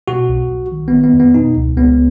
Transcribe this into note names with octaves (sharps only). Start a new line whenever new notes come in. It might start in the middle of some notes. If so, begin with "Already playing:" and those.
B2 F#4
B1
B1
D#3
D#3 B3
B3
F2
B3
B2 D#4
C#2
C#2 B3